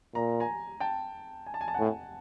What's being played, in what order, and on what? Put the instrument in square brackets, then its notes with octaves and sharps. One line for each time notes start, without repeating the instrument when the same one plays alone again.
[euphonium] A#2 [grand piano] A#5
[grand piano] G#5 A#5
G5 A5
G#5
A5
G#5
A5
[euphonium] A2 [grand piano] F#5 G#5